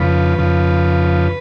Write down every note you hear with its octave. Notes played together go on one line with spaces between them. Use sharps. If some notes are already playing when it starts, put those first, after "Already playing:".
Already playing: F2 C#3 F3 B4
F2 C#3 F3